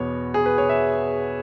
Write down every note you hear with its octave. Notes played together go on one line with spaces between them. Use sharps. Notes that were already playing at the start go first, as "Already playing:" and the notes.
Already playing: E2 B2 B3 C#5
G#4
B4
C#5
E5